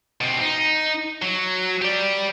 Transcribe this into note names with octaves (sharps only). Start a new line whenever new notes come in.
B2 C4
D#4
F#3
G4 D5